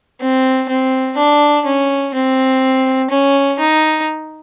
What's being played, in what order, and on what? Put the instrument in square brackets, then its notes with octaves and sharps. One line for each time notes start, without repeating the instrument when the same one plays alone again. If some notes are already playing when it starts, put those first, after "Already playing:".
[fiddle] C4
C4
D4
C#4
C4
C#4
D#4